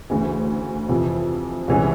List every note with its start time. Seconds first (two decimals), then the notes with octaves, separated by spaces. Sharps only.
0.10 D2 C#3 E3
0.89 F2 C3 E3
1.68 C2 C3 E3 G#3 C#4